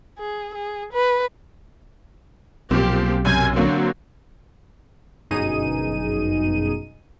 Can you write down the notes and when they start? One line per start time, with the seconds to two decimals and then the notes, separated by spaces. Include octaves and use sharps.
0.19 G#4
0.55 G#4
0.93 B4
2.71 B1 A#2 F3 C4 G4
3.25 F#2 C3 G#5 G6
3.56 D3 F#3 A#3 C4
5.31 G1 F#2 B2 D#4 G#4 D#7